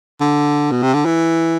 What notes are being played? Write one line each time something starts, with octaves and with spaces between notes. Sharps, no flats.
D3
B2
C3
D3
E3